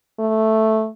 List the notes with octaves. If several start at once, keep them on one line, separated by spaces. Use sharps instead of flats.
A3